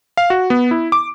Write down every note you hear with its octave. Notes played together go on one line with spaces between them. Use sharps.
F5
F#4
B3
E4
D6